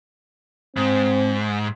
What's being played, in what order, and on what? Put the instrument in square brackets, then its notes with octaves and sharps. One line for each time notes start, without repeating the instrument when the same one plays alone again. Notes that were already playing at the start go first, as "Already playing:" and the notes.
[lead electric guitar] G#2 [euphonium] C4